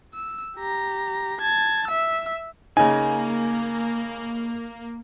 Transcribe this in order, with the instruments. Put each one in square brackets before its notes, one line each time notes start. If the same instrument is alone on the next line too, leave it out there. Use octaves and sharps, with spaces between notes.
[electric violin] E6
G4 A#5
A5 G#6
E5 E6
[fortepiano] C#3 D#4 [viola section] A#3 [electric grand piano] G#5